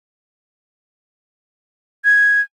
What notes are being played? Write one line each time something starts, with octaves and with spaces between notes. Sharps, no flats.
G#6